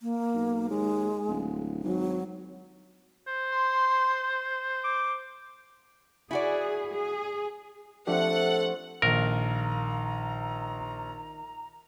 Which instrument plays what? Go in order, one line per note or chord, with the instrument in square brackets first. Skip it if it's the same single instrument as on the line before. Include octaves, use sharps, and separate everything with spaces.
[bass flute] A#3
[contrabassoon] B1
[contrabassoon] D#2 [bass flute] G#3
[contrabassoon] D1
[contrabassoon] G#1 [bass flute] F#3
[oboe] C5
[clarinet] C6
D6
[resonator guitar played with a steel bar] E4 F#4 D5 [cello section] G#4
[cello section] G#4
[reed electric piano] F3 D4 G4 [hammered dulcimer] A3 C4 [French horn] A4 [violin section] F#5
[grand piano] A#1 [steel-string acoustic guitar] D#3 F5 [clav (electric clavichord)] A#4 [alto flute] A#5